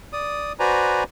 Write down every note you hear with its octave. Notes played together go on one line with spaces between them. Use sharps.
D5 D#6
F#4 B4 C5 D5 G#5 A#5